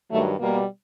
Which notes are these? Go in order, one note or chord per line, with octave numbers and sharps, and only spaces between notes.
G2 D#3 F#3 A3
B2 G3 A#3